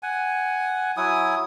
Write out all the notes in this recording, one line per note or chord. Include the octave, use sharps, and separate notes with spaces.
F#5 G#5
F#3 E4 G#5 D#6